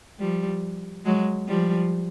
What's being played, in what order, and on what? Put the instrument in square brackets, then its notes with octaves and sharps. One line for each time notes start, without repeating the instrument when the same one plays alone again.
[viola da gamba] F3 G3
F#3 G#3
F3 G3